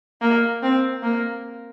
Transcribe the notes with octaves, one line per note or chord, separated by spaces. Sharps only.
A#3
C4
A#3